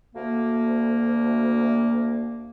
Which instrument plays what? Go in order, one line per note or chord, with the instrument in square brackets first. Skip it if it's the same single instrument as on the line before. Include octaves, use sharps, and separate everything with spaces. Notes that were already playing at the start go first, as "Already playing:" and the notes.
[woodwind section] D2 A#3